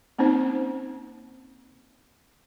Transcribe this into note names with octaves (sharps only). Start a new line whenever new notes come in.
A#3 C4 C#4 D#4 C5